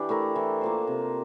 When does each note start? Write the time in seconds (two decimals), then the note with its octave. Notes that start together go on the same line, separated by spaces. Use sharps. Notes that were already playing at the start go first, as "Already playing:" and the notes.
Already playing: E3 D4 G4
0.09 A3 E4 A#4
0.36 E3
0.61 A#3 F4 C5
0.87 C3